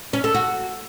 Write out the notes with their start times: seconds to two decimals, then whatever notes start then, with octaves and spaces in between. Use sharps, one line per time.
0.13 C#4
0.24 A4
0.34 F#4